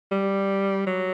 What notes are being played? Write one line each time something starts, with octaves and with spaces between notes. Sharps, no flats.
G3
F#3